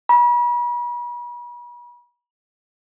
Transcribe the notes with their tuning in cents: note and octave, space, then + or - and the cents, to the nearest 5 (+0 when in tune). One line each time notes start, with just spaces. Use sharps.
B5 -40